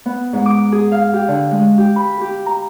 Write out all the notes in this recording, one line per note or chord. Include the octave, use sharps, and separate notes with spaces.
B3
G#2
D6
G#4
F5
G4
D3
G#3
G4
B5
G4
A#5